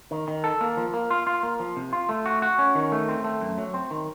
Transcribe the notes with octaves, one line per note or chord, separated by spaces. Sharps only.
D#3
D#3
A4
A#3
F3
A#3
F4
F4
A#3
F3
C3
F4
A3
F#4
F#4
C#4
D#3
A3
C4
A3
F#2
F#3
C4
D#3